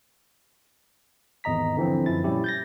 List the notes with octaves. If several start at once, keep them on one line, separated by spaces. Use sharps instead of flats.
G#1 E2 D#5 A#5 B6
D3 E3 F3 C4
F#2 F3 E4 A6
A#2 G3 C#4 E4 G4
G6 A6 A#6